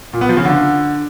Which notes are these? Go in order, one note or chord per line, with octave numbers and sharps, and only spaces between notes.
A#2
B3
F3
C#3
D3